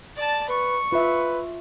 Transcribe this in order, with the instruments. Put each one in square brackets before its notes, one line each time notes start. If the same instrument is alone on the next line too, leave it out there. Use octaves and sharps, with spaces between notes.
[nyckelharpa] D5 A5
[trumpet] B4 [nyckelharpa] C#6
[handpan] F4 E5 [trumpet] B4